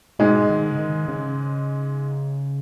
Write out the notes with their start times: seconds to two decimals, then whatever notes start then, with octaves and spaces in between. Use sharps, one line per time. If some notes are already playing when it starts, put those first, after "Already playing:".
0.19 G#2 B2 G#3
0.49 D#3
0.71 C#3
0.79 D#3
1.08 C#3